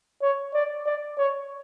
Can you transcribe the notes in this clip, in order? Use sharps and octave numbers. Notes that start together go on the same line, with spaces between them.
C#5
D5
D5
C#5